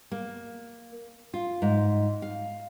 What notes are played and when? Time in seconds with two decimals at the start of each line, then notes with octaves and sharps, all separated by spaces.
0.12 A#3
1.34 F4
1.62 G#2
2.22 F5